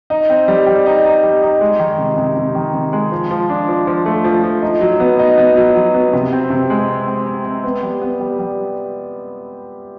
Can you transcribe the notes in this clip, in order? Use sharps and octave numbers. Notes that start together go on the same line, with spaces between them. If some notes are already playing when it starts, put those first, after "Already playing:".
D#4
C4
G3
G3
D#4
D#4
G3
D#4
G#3
D#3
C3
C3
C3
D#3
C3
G#3
F3
F3
D4
F3
F3
A3
F3
F3
D#4
F#3
B3
D#4
B3
F#3
F#3
B3
C3
C4
C3
G#3
C4
C4
C4
C4
B3
G3
B3
G3
G3